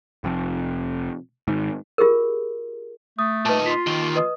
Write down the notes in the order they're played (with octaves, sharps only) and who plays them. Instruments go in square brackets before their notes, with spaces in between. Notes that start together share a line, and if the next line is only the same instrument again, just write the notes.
[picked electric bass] F1 F2
G#2 D#3
[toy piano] F4 G4 G#4 A#4
[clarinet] A3 [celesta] D#6
[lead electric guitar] A#2 D#4 [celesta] B4 A5
[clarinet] F4 [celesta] C6 B6
[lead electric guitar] D#2 D#3 [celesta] G7
[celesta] B4 D#5 D#6